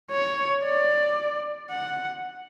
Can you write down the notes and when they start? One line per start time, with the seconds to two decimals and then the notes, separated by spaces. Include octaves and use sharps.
0.11 C#5
0.64 D5
1.71 F#5